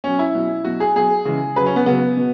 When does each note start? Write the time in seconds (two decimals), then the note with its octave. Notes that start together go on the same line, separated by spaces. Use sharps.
0.04 B2 F#3 C#4
0.19 E4
0.34 B2 F#3
0.65 B2 F#3 F#4
0.80 G#4
0.96 B2 F#3 G#4
1.25 C#3 E3 G#3
1.56 C#3 F#3 B4
1.66 C#4
1.76 B3
1.86 C#3 F#3 B3
2.17 B2